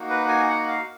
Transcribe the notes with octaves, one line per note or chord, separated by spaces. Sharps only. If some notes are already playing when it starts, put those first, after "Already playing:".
Already playing: A#3 D#4 F#4
B4
G#5
F#5
F5